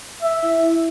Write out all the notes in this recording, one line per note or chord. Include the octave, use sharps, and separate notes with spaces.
E5
E4
E4